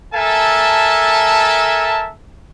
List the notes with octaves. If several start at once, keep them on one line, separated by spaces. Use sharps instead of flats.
A4 A#4 E5 G#5 A5